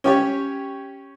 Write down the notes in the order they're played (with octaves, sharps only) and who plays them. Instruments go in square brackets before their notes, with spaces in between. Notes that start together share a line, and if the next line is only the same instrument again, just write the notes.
[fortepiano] C#4 G4 C#5